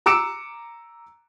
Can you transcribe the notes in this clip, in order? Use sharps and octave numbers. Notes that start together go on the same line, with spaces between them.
A#5 D6 E6 C#7 D7 E7